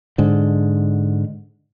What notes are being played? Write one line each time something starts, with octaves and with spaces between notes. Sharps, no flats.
G#2 D3